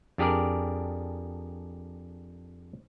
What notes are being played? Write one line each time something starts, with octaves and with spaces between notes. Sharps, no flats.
F2 D4 G4 G#4 A#4 D5